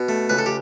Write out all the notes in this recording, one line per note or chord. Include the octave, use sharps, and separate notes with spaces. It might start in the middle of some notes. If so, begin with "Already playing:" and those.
Already playing: B2
A3
C#2 B4
A4
G4